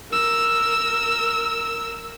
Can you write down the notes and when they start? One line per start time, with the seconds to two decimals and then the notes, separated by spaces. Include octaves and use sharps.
0.11 A#4 E6